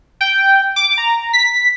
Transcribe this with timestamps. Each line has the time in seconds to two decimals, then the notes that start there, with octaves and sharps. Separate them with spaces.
0.21 G5
0.76 D6
0.98 A#5
1.33 B6